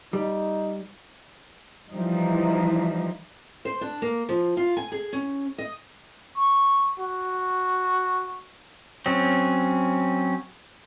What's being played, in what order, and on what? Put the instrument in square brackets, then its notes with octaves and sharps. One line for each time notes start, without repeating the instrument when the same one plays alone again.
[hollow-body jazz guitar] G3 [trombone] D#4
[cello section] E3 F3 G3 D#4
[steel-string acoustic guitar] C5
D4
A#3
F3
F4
G#5
G#4
C#4
D#5
[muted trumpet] C#6
F#4
[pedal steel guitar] F#3 C4 C#4